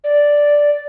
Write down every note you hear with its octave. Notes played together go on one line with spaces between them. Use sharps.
D5